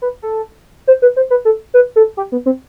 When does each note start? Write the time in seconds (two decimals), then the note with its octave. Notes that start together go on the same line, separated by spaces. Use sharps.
0.02 B4
0.22 A4
0.87 C5
1.02 B4
1.16 C5
1.30 B4
1.45 A4
1.74 B4
1.96 A4
2.17 G4
2.32 B3
2.46 C4